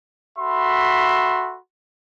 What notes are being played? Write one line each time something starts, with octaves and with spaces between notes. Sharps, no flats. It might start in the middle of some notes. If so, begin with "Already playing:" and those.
F#4 A4 E5 B5 C6